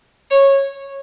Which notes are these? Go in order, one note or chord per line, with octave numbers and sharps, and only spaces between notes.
C#5